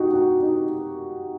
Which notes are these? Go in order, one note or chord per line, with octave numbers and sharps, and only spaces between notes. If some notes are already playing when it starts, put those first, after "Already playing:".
Already playing: D#4 F#4 G4
F#4
D#4